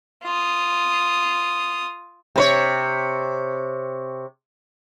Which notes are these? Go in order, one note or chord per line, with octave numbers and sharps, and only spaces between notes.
F4 D#6
C3 B4 C#5